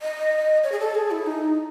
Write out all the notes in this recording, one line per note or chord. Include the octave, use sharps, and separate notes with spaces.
D#5
C#5
G#4
A4
G#4
E4
D#4